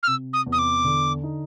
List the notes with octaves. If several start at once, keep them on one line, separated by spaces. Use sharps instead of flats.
F6
C3 E6
D#6
E2
D#6
D6
D3
D#4